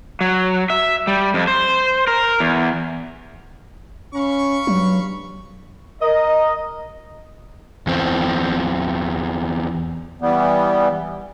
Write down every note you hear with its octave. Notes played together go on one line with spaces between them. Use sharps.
F#3
E5
G3
F2
C5
A#4
E2
C#4 F5 B5 C#6
G2 F#3
A#4 D#5
E2 C4
E3 G3 B3